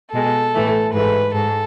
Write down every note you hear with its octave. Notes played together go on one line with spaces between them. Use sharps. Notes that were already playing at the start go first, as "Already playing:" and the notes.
B2 G#3 A4
A2 E3 A3
G#2 E3 A3 B4
G#2 A4